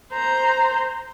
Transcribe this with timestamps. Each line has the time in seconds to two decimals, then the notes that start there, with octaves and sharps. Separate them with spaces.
0.13 C5 A#5